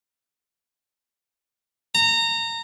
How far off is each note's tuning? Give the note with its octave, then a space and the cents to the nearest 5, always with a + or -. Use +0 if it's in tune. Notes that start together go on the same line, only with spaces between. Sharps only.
A#5 -25